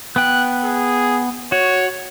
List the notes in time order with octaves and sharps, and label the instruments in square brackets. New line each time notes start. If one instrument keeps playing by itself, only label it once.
[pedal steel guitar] B3 G5 [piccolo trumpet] F#6
[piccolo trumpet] G#4
[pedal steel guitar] F#4 [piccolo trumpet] C#5